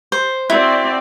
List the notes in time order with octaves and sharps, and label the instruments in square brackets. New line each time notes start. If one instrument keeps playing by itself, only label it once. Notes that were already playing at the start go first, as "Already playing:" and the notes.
[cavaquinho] C5
[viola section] C4 F#4 D5 [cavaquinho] E4